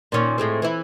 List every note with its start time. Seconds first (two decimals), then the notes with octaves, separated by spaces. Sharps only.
0.12 A#2 D#3 C#4
0.38 A2 G#3 C4
0.62 E3 E4